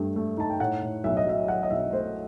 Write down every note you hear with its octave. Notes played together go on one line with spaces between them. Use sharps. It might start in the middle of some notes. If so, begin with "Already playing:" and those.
Already playing: G2 A3
A3
D#4 A5
G5
A2 F#5
A2
B1 E5
D#5
F#3 E5
F#3 F#5
D#5
B1 E5
A3 C5